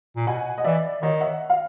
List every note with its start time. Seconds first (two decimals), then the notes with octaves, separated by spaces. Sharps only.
0.16 A#2
0.27 B2 F#5 G#5
0.58 D#5
0.64 E3 D5 E5
1.02 D#3 C#5 D#5
1.21 E5 F#5
1.50 F5